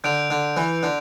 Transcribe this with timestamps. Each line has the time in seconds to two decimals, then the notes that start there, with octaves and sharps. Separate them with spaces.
0.04 D3 G6 D7 F7
0.30 D3
0.57 E3
0.83 D3